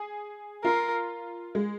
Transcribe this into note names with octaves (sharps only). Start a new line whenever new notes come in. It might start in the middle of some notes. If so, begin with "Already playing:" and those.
Already playing: G#4
F4 A#4
G#3